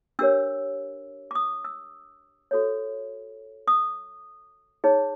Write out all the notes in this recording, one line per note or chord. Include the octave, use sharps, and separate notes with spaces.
D4 G4 A#4 C#5 E6
D6
D#6
E6
F#4 A4 C#5
D#6
D#4 G#4 C#5